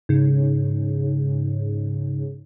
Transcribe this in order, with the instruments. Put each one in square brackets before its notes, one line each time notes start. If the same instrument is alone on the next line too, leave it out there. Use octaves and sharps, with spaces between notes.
[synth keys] G#2 C#3